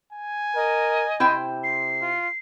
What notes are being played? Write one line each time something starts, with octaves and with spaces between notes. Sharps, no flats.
G#5
A#4 D#5
C3 E4 C5 G5
C7
F4